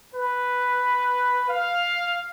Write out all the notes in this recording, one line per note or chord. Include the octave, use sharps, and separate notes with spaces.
B4
F5